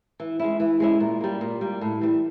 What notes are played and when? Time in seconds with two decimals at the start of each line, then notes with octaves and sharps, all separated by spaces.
0.20 E3
0.40 G#3 C#4 E4
0.60 E3
0.80 G#3 C#4 E4
1.00 A#2
1.21 G3 A#3
1.41 A#2
1.61 G3 A#3
1.81 A2
2.01 E3 G3